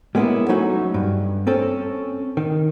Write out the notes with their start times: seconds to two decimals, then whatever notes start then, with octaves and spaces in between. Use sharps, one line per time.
0.15 G3 G#3 A#3 B3 C#4 E4
0.49 F#3 A3 C#4 D#4 F#4
0.94 G2
1.47 C4 C#4 A4
2.37 D#3